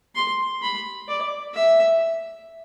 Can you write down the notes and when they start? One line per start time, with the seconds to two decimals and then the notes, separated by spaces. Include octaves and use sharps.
0.15 C6
0.62 B5
1.08 D5
1.54 E5